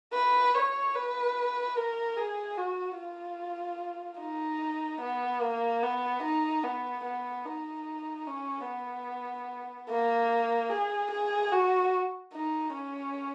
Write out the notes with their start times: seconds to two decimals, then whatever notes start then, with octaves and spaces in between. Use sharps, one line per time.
0.14 B4
0.54 C#5
0.95 B4
1.76 A#4
2.17 G#4
2.57 F#4
2.98 F4
4.20 D#4
5.01 B3
5.42 A#3
5.83 B3
6.23 D#4
6.64 B3
7.05 B3
7.45 D#4
8.27 C#4
8.67 B3
9.89 A#3
10.70 G#4
11.11 G#4
11.52 F#4
12.33 D#4
12.74 C#4